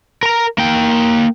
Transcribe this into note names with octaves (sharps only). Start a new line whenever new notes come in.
A#4 A#5
A#3 G5